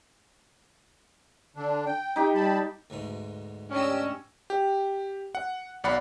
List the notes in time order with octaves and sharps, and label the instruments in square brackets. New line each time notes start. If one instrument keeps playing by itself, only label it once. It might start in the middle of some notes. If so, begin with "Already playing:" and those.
[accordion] D3 D4
G5
[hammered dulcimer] D#4 G4 [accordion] G5
[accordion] G3 A5 B5
[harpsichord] D2 G#2 B2
[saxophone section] C#4 [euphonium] D4 [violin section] G4 D#5 E6
[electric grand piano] G4
F#5
B1 D5 F#5 B5